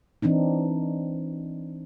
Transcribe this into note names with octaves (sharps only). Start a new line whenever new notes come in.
E3 C4 D4 D#4